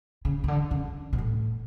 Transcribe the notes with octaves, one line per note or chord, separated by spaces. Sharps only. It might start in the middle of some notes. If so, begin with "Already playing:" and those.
C#3
C#3
D3
C#3
B2
A2